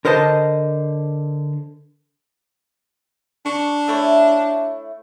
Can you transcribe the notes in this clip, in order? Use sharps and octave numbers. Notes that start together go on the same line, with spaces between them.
D3 A#4 C5 D#5 A5
D4 C#6
A3 E4 C#5